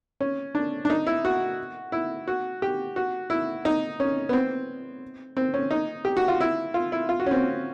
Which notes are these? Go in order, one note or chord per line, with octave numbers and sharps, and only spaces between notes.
C#4
D4
D4
D#4
E4
F#4
E4
F#4
G4
F#4
E4
D#4
C#4
B3
C4
C4
C#4
D#4
G4
F#4
F4
E4
F4
E4
F4
F#4
C#4
C4